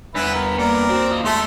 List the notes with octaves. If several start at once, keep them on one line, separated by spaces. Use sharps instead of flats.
E2 G2 B3 E4 B4
A#4
A#3 A#4 D5
C4 F#4
F4 D#5
G#3 A3 A4 C6